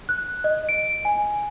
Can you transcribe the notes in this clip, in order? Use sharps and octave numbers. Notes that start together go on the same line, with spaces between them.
F#6
D#5
D7
G#5